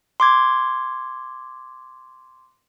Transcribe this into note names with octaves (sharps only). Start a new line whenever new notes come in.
C6 D6 G#6